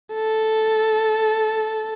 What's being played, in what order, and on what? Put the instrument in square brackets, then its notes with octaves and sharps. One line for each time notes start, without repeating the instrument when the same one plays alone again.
[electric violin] A4